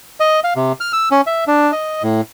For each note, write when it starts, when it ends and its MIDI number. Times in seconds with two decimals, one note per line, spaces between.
0.20 0.40 75
0.44 0.54 77
0.56 0.72 48
0.80 0.92 89
0.93 1.09 88
1.11 1.21 61
1.27 1.44 76
1.47 1.72 62
1.72 2.03 75
2.03 2.21 45